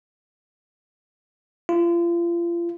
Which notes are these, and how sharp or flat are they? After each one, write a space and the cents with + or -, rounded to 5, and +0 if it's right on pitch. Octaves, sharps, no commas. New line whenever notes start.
F4 -35